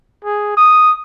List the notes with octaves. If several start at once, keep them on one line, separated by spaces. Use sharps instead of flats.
G#4
D#6